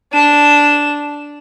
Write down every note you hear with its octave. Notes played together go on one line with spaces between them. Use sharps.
D4 E7